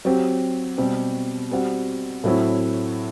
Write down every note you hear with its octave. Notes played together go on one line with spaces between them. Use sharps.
F#3 C4 G4
B2 G3 C4 G4
G3 C4 F#4
A2 F#3 C4 E4